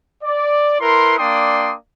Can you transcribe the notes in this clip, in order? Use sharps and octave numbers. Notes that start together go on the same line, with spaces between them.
D5
E4 A#4 B4 C6
A#3 D4 D5 G5 C6 D#6